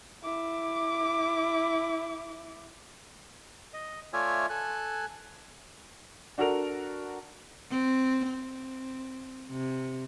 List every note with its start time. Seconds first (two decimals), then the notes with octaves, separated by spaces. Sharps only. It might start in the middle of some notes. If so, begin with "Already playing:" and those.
0.23 E4 D6
3.73 D#5
4.13 A3 F4 C#5 D5 E5 G#5
4.50 A4 G#5 F#6
6.38 D4 F#4 A4 A#4 F7
7.70 C4
8.29 C4
9.51 C3